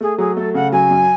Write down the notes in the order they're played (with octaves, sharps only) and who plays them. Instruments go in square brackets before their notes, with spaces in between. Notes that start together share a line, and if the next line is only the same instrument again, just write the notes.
[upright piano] A3 [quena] G#4
[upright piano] F#3 [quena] G#4
[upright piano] A3 [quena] A4
[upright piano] C#3 [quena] F#5
[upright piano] F#3 [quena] G#5
[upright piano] F#2